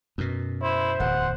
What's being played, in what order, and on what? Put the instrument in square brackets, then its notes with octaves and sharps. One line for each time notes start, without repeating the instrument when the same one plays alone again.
[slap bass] F#2 B2
[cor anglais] E4 [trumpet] C5
[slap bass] D1 E2 [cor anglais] F#5